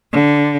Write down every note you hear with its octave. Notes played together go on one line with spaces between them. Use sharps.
D3